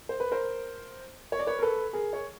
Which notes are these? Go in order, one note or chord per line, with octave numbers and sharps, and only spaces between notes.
C5
B4
A#4 C5
C#5
D5
B4 C#5
A#4
A4 B4
G#4 A#4
C#5